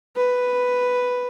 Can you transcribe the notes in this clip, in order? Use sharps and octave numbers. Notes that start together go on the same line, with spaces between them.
B4